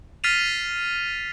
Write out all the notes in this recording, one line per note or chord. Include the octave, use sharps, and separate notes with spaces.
F6 A6 B6 C7 D#7 F7